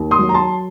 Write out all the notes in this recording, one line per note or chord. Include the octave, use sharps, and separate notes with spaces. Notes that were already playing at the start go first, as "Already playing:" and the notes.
Already playing: D#2
C6 D#6
F#3
A#5
A5 C6